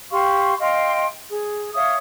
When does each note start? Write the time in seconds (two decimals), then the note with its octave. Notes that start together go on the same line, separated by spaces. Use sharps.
0.11 G4 F5 C6 C#6
0.60 D#5 F5 G5 C6
1.30 G#4
1.73 C#5 E5 F5 D#6